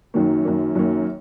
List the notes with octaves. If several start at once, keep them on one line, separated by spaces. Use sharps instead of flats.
F#2 D#3 A#3
F#2 D#3 A#3
F#2 D#3 A#3